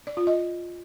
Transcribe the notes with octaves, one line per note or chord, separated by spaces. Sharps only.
D5
F4
D#5